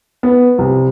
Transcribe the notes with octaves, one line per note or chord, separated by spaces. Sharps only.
B3
C2